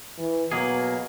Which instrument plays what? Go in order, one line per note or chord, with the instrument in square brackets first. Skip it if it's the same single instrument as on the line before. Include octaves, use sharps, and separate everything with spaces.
[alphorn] E3
[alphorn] B2 [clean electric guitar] F#3 A#3 G#4